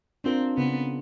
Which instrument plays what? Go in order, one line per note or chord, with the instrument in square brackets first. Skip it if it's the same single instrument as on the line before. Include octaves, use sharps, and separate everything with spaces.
[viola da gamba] C4 [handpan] D4 F4 A#4
[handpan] C#3 [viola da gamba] B3